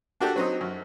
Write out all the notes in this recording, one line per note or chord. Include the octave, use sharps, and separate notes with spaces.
D4 F#4 G4 A4
F#3 C4 D#4
F#2